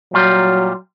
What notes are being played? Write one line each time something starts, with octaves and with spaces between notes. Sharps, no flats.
A#2 F#3 G3 F4